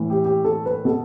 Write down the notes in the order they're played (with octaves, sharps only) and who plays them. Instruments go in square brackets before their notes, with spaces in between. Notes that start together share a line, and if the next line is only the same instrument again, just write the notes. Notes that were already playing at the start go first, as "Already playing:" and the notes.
Already playing: [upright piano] A2 E3
G4
G4
A4
B4
B2 A4